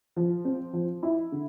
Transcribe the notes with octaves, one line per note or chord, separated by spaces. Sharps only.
F3
C4
F3
E4
D3